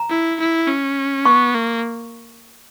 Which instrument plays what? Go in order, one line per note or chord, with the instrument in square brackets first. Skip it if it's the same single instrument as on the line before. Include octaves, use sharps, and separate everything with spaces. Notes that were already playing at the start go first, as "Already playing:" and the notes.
Already playing: [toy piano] A#5
[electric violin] E4
E4
C#4
[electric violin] B3 [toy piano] C#6
[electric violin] A#3